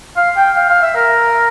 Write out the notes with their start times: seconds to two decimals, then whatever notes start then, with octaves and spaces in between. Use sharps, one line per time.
0.17 F5
0.36 G5
0.56 F5
0.69 F5
0.82 E5
0.96 A#4